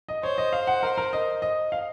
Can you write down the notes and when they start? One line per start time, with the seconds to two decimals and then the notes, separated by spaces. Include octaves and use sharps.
0.08 D#5
0.23 C5 C#5
0.38 D#5
0.53 F5
0.67 F#5
0.83 A#4
0.98 A#4
1.13 D#5
1.42 D#5
1.72 F5